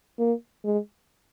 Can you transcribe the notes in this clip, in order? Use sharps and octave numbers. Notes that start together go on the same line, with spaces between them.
A#3
G#3